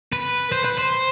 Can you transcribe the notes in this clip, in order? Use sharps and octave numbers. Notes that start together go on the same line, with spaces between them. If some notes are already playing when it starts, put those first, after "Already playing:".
B4
C5
B4
C5